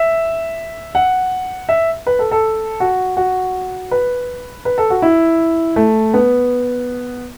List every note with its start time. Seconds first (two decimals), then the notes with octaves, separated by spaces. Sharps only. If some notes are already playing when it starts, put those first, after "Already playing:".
Already playing: E5
0.95 F#5
1.69 E5
2.07 B4
2.19 A4
2.31 A4
2.80 F#4
3.17 F#4
3.91 B4
4.65 B4
4.78 A4
4.90 F#4
5.02 E4
5.76 A3
6.14 B3